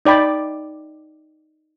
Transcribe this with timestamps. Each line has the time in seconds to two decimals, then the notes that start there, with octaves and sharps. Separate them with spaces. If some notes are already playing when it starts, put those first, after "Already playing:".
0.05 D#4 D5 G5 B5 D6